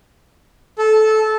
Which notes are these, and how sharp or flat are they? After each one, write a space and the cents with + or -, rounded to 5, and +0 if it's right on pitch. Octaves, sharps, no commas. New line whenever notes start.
A4 -15